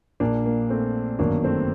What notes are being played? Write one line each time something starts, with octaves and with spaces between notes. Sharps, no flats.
A#1 A#2 A#3 D4
A#3
A3 C4
G1 F#2 D#3 A#3 D4
A3 C4